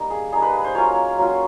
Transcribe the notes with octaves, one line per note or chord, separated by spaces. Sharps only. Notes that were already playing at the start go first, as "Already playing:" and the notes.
Already playing: G3 A#3 D#4
G#4
G3 A#3 D#4 G#4
B4
B4
C5
F#3 A#3 C#4 F4 C#5
F#3 A#3 C#4 F4